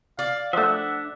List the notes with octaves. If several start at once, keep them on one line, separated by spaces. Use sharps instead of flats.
D5 F5
F3 A3 D4 E5 F#5